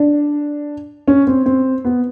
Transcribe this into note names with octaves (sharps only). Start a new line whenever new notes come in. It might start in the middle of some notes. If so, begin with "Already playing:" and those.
Already playing: D4
C#4
C4
C4
B3